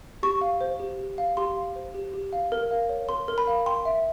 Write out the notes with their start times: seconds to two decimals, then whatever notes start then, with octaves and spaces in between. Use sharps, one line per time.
0.23 G4 C#6
0.41 F5
0.61 C5
0.80 G4
0.99 G4
1.18 F5
1.37 G4 C6
1.57 F5
1.76 C5
1.94 G4
2.13 G4
2.33 F5
2.52 A#4
2.71 F5
2.89 C#5
3.09 A#4 C6
3.28 A#4
3.38 B5
3.47 F5
3.66 G5 C6
3.85 E5